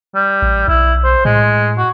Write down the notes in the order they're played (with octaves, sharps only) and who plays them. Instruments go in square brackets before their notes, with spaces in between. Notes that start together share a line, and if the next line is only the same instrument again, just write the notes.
[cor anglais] G3
[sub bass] A1
[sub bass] B1 [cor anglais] E4
[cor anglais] C5
[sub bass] A2 [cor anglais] G#3
[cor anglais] F#4